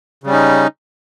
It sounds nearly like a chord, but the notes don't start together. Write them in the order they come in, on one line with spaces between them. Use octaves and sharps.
C#3 G3 C#4 D#4